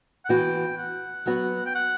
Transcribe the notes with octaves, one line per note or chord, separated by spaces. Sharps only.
F#5
E3 B3 F#4 G5
F#5
F#3 B3 F#4
G5
F#5